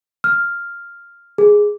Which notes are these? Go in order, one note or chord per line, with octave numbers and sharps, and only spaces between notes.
F6
G#4